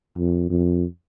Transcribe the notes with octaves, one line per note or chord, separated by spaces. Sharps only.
F2
F2